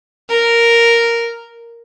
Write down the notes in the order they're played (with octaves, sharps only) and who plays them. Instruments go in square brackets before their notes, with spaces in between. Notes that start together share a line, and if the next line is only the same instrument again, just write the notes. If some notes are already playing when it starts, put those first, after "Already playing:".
[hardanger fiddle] A#4